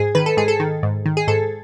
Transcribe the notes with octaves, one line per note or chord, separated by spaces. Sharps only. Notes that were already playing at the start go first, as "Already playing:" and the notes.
Already playing: G#2 G#4
D#3 B4
A4
G#2 G#4
A4
D#3
G#2
D#3
G#4
G#2 A4